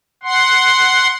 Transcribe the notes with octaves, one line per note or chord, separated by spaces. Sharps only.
F#5 C6